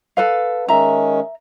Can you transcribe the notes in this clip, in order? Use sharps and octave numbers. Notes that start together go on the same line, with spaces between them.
A4 B4 F5
D#3 G#3 C#4 E5 A#5